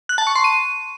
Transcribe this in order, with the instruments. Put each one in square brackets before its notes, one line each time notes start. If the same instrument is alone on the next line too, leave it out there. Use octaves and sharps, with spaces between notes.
[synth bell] F#6
A5
C#6
C6
D#7